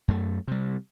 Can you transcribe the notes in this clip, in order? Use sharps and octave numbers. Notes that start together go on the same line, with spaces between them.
F#2 A3
C3 G3